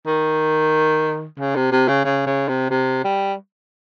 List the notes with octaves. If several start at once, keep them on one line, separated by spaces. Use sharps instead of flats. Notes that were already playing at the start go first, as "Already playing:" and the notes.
D#3
C#3
C3
C3
C#3
C#3
C#3
C3
C3
G3